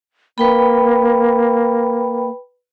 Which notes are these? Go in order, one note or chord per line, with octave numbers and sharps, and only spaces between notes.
A#3 B4 G5 B5